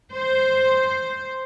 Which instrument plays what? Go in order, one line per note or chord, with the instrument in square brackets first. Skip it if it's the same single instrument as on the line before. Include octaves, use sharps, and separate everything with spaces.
[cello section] C5